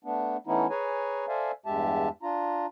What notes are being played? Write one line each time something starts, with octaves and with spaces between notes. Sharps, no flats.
A3 B3 D4
E3 A3 B3 C#4 D#4 E4
G#4 B4 C#5 G#5 A#5
A4 C5 D5 E5 F5 G#5
E2 G2 G#3 G4 E5 A5
D4 F4 A#5